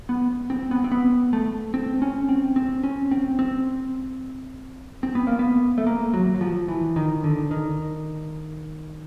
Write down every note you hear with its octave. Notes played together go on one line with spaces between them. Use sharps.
B3
C4
B3
C4
B3
A3
C4
C#4
C4
C4
C#4
C4
C4
C4
B3
A#3
B3
A3
A#3
F#3
F#3
F3
E3
D#3
D3
D#3